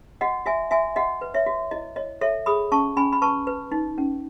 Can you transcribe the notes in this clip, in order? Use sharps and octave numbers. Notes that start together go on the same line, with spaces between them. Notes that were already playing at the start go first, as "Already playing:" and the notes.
F#4 D#5 F#5
F#4 E5 G#5
F#4 E5 G#5
F#4 D#5 F#5
B4
C#5 E5
F#4
E4 D#5
C#5 D#5
A4 C#5 E5
G#4 B5 D#6
C#4 A5 C#6
C#4 G#5 B5
B5
B4 A5 C#6
B4
D#4
C#4